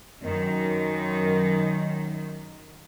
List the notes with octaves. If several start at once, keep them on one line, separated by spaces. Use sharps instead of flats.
F#2 D#3